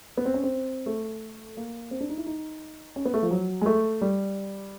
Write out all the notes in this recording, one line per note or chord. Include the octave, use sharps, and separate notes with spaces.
B3
C4
C#4
C4
A3
A#3
C4
D4
D#4
E4
D#4
C#4
B3
A3
F3
F#3
G#3
A3
G3